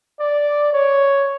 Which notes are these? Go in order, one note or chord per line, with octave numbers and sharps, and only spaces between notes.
D5
C#5